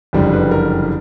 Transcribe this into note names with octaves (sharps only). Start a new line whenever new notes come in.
F#1 F2 D3 G3
B4
A#4